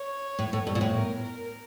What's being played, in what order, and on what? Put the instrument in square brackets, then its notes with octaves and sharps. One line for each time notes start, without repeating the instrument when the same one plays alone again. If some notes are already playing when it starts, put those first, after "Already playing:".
Already playing: [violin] C#5
[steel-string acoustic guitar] A2
A2
G2
A#2
A2
[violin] A#4
A#4